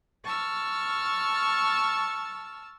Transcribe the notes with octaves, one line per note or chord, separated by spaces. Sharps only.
A5 C#6 E6 F6